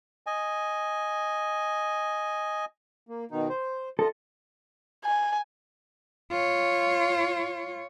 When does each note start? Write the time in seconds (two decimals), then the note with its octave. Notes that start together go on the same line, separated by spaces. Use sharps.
0.26 D#5 G#5
3.07 A#3
3.31 B2 D#3 D#4
3.49 C5
3.99 F4 A4 D#5
5.05 G#5
6.31 F4 C#5